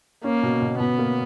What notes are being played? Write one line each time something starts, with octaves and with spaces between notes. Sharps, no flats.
A#3 C#4
B2
B2
B2 B3
A#3